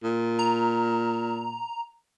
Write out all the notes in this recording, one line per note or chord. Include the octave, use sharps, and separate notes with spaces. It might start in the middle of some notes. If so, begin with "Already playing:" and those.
A#2
A#5